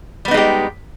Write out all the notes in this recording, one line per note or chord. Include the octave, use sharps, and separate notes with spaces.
G3 G#3 B3 D#4 G4